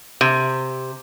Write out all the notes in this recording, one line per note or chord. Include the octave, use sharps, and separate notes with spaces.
C3